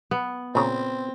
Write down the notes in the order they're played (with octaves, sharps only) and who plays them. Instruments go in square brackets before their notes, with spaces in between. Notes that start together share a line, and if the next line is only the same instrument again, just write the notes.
[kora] B3
[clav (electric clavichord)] A#2 C#3 [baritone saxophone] C4